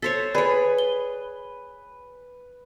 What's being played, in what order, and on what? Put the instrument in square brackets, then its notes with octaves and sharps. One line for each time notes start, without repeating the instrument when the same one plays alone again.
[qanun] A4 C5 C#5 [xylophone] B6
[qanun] G#4 C#5 [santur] B4 [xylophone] D5
[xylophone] G7